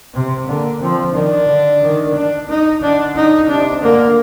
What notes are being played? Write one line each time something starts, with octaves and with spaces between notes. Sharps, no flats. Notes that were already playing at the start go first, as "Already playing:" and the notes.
C3 C4
D3 A#3
F3 C4
D#3 D4
D3
D#3
D4
D#4
D3 D4
D#4
C3 D4
D3 A#3